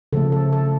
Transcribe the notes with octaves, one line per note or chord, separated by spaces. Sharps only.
C#3 F3 A3 A4
A4
A4